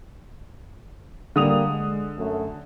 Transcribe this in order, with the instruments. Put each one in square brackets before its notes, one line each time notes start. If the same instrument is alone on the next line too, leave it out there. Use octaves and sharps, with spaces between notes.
[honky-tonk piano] D3 D#6 F7 [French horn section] G3 A#3
[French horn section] G#3
F#2 A3